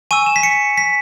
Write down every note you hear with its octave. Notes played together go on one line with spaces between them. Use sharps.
G#5 C#6 E6 D#7
E7
B6
C#7
B6